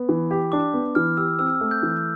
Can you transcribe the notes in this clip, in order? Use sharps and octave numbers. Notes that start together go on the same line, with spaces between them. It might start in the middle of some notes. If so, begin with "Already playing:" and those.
Already playing: B3
E3
G4
D4 D6
B3
E3 F6
G4 E6
C4 E6
A3
G6
E3